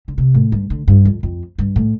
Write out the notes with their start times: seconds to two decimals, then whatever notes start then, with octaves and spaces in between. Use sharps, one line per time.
0.08 D3
0.18 C3
0.34 A2
0.52 G2
0.70 D3
0.88 G2
1.05 F2
1.23 F2
1.58 G2
1.76 A2